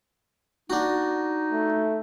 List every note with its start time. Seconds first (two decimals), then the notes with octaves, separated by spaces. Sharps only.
0.70 D4 D#4 F#4
1.52 A3